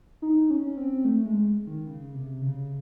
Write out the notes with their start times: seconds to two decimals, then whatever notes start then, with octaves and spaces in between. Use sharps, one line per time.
0.22 D#4
0.50 C#4
0.77 C4
1.05 A3
1.25 G#3
1.67 D#3
1.87 C#3
2.15 C3
2.42 C#3